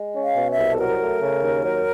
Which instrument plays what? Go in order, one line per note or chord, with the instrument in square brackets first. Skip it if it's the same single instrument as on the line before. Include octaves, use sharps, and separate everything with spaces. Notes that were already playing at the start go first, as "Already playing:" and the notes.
Already playing: [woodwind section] G#3
C#4
F5
B2
E5
C2
A4
F#3 A#4
A3
C#3
D#2
F#3